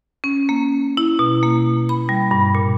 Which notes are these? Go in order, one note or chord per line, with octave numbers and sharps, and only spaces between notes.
C#4
A#3
E4
B2
A#3
B5
G3
G2
A#2